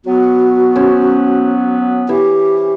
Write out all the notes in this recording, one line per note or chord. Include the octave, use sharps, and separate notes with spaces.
F#3 B3 F#4
C#4 C5
E3 G4